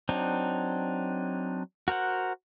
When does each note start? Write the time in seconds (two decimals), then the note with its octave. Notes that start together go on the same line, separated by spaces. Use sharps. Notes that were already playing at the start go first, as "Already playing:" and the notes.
0.09 F#3 C4 D4 D#4
1.88 F#4 A#4 C5 F#5